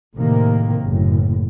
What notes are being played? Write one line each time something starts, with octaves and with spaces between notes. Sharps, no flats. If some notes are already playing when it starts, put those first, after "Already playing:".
A2 C3 D#3 A#3
F#1 A2